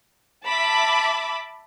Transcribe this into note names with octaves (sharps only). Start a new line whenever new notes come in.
E5 A5 B5 D6